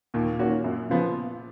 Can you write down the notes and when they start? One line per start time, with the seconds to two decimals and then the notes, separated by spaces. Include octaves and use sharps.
0.14 D#2 A#2
0.39 D#3 A#3 C#4 F#4
0.64 F#2
0.90 C#3 F3 B3